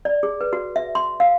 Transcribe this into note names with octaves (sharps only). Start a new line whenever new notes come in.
D5
G#4
B4
F#4
E5
C6
F5